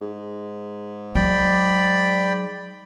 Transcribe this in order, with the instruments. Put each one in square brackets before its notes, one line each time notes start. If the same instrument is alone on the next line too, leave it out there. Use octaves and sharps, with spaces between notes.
[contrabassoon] G#2
[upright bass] F#3 [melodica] D5 G5 B5